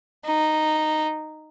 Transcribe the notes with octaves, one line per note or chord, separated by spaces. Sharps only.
D#4